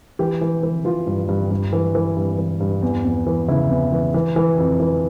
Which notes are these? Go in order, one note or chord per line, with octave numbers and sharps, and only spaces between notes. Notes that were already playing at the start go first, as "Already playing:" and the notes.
E3 G4
E3
E3
E3 F4
G2
G2
G2
E3
E3
G2
E3
G2
E2
E2
E3
C#3 E4
E2
E3
E3
E3
F2
E3